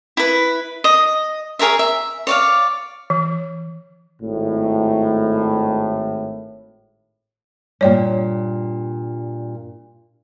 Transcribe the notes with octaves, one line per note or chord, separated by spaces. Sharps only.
E4 B4
D#5
G#4 A#4 C#5 E5
E5
C#5 D5 F5
E3
G#1 A2
G2 A#2 C#5 D5 G5